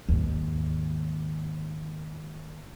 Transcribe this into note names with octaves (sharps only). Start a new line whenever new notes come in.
D#2 G#2